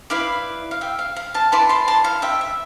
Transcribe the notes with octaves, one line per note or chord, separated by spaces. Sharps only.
E4 B4 D5 F5
F5
E5 G5
F5
F5
F5 A5
E4 B4 D5 A5 C6
A5 C6
A5 C6
F5
E5 G5
E5